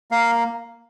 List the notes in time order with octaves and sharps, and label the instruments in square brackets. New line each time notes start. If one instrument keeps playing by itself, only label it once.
[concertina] A#3 F5